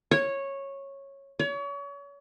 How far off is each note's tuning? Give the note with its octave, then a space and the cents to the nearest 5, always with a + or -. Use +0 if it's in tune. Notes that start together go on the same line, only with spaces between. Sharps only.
C#5 -10
C#5 +35